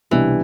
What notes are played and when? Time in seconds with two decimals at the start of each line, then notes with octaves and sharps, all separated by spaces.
0.11 C2 B2 E3 G3 D4 G4